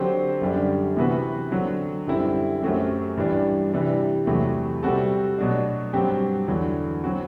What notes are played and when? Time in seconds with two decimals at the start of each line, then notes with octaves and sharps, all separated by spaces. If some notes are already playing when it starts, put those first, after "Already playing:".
Already playing: D3 F#3 C4 G4 C5
0.41 F#2 D3 G3 D4
0.97 C3 E3 B3 F#4 B4
1.51 D3 F#3 C4
2.07 F#2 D3 G3 C4 E4
2.63 F#2 F#3 A3 C4 G4
3.17 G2 E3 G3 D4
3.73 C3 E3 G3 D4
4.27 E2 C3 F#3 A3
4.83 C3 G3 C4 F#4 A4
5.38 B2 F#3 A3 D4
5.93 G2 F#3 C4 G4
6.48 E2 D3 F#3
7.04 F#3 C4 F#4